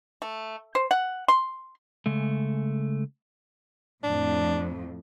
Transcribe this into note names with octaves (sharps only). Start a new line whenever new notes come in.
A3
C5
F#5
C6
C#3 G#3 A3
F2 A2 D4